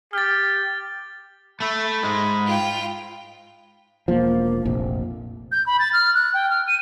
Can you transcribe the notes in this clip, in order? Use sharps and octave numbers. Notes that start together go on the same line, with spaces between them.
G4 F6 A6
A3 A4 B5
G#2 G#3
F4 G5
E1 F3 A#3
F1 A#1 F3
G6
B5
A6
F6
F#6
G5
F6
D#7